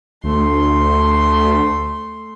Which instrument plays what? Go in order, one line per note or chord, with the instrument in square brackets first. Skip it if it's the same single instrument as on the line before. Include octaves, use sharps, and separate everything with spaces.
[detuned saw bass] D2 [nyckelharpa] A3 C6